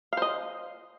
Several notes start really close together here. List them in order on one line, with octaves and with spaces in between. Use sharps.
F5 C5 D#5